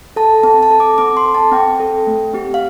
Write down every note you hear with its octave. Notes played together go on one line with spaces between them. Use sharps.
A4 A5
C4 A5
A5
A4
D6
C4 D6
C6
A4
A5
C4 G5
A4
A3
C4 G4
F5